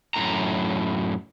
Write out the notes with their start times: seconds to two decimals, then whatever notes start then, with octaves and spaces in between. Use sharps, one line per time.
0.14 F#2 A2 A#5